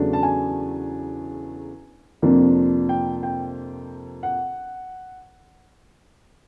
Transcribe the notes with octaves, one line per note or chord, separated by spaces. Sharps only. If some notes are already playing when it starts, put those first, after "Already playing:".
Already playing: E2 C#3 F#3 A3 D4
A5
G#5
F2 C3 F3 A#3 D4
G5
G5
F#5